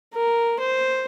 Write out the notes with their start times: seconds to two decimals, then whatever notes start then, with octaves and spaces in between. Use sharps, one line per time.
0.14 A#4
0.60 C5